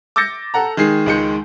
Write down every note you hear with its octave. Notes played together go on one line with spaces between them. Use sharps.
D6 E6 G6 A6 A#6 C#7
A4 F#5 A#5
D#3 G#3 G#4 C7
C#2 D#3 G#3 G6 C#7